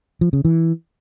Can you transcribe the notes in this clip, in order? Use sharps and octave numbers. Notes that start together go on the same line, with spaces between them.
F3
C#3
E3